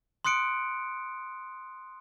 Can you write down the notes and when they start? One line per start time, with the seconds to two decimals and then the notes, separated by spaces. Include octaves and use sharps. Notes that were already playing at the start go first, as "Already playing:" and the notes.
0.25 C6 D#6 F#6 C#7 D7